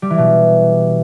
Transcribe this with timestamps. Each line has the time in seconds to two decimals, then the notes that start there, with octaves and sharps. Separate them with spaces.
0.02 G3
0.10 E3
0.18 B2